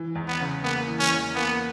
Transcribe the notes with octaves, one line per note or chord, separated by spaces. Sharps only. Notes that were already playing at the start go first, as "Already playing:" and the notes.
Already playing: E3
E2
B3
C#3
A#3 B3
E3
C#4
E2
A#3 B3